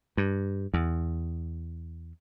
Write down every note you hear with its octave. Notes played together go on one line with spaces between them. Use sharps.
G2
E2